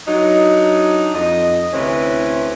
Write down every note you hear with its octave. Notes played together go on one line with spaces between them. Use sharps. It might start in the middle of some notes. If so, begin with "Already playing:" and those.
F#3 D4 D#4
F2 D#5
D2 C3 C#4 E4 B4